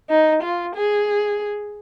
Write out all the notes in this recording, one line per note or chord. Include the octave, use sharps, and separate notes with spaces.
D#4
F4
G#4